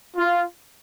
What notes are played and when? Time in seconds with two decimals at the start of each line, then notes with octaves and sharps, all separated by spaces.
0.17 F4